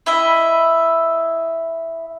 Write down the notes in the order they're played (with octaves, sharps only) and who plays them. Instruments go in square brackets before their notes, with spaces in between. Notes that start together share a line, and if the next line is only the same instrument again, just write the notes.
[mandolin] E4 D#5 E5